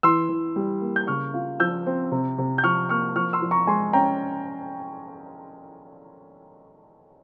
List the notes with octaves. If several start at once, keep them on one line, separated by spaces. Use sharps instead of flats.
E3 C6 E6
E3
G3
A#3
G6
C#3 C#6 F6
F4
F3 E6 G6
C4
C3
C3
G6
F3 C#6 F6
A#3 C#6 F6
F3 C#6 F6
C6 E6
F3
A#5 C#6
G#3 G#5 C6
C#4 G5 A#5